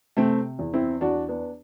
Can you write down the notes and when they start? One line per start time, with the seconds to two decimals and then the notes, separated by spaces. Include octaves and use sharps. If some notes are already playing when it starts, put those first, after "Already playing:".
0.17 C3 A3 C4
0.59 E2
0.74 C4 E4
1.01 E2 D4 F#4
1.29 B3 D4